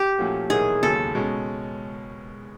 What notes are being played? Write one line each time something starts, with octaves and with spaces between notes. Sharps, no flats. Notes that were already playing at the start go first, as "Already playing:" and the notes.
Already playing: G4
A#2 F3 A3 C#4 F#4
E2 B2 F#3 A#3 D#4 G#4
E1 D#2 C#3 F#3 A4
B2 G#3 C#4